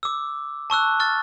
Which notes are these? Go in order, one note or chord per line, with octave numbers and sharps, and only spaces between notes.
D6 E6
A5 C#6 E6 F#6
C#6 F6 A6